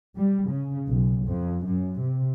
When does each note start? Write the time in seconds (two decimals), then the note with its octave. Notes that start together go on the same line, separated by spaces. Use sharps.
0.17 G3
0.49 C#3
0.88 B1
1.25 F2
1.66 F#2
2.00 C3